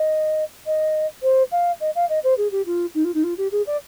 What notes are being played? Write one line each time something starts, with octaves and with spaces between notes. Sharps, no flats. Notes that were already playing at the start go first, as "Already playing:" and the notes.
Already playing: D#5
D#5
C5
F5
D#5
F5
D#5
C5
G#4
G4
F4
D#4
F4
D#4
F4
G4
G#4
D5